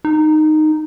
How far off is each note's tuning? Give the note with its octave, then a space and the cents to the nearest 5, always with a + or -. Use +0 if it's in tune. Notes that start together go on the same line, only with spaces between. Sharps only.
D#4 -10